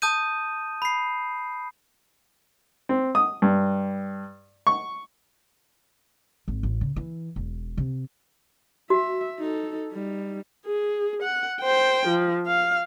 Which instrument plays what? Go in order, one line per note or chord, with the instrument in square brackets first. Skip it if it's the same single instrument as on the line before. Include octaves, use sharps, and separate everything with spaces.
[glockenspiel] A5 D#6 G6 D#7
B5 C7
[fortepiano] C4
D#6
G2
C#6
[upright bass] G#1
A1
C#3
E3
E1
C3
[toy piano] F#4 [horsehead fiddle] E5
[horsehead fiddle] D#4 A4
G3 D#4
[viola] G#4
F#5
C5 G5
F3
F5